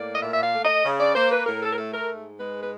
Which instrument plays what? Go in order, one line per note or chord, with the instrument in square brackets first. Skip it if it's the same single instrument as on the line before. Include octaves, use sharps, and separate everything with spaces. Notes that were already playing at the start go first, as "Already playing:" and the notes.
Already playing: [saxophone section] A2 A#3 D5
D#5
A#2 E5
E5
F5
A3
D#5
C#3
D5
A#3 C5
B4
A2 A#4
A4
A#4
A3 A4
A#4
G#2
G#3 B4
B4